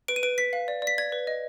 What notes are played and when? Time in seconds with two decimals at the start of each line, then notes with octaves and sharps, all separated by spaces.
0.08 B4 D7
0.16 D#7
0.23 B4 D7
0.38 B4 B6
0.53 F5
0.68 D5
0.82 D5 B6
0.98 D5 G#6
1.12 B4
1.27 D#5